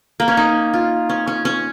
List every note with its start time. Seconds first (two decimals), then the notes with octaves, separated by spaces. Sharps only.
0.20 A#3
0.28 C#4
0.37 D#4
0.74 F4
1.09 C#4
1.27 C#4
1.45 C#4